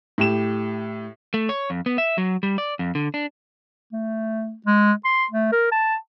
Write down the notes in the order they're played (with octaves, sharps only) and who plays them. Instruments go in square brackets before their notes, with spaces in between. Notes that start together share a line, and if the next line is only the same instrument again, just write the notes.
[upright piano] A2 G4 E7
[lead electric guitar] A3
C#5
F2
B3
E5
F#3
G3
D5
F2
D3
D4
[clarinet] A3
G#3
C6
A3
A#4
A5